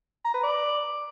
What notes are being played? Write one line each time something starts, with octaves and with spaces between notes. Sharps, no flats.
A#5
B4
D5